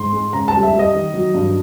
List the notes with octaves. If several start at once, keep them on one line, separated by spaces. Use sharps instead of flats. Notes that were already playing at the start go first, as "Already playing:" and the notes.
Already playing: G#2 C6
G#3
C#3 A#5
A5
G3
E5
G3
D#5
D#3
F#3
G2